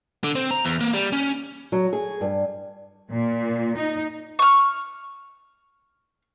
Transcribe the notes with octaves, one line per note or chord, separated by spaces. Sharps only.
D3
C4
A#5
E2
A#3
G3
C#4
F#3
G#4
G2
A#2
D#4
C#6 F6